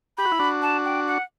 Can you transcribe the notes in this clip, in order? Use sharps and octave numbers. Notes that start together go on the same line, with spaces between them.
G4 B5
F#4
E4
D4 F#4
A5
G5
F#5